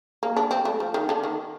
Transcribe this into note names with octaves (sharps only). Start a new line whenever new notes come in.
A#3
D4
C4
A3
F3
D#3
D3
D#3